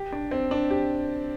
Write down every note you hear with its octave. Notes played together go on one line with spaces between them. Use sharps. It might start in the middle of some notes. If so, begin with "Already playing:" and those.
Already playing: G4
D4
C4
D4
G4